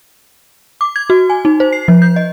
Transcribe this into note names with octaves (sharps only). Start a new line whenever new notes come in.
D6
G#6
F#4
G#5
D#4
C5
C7
F3
G6
D#5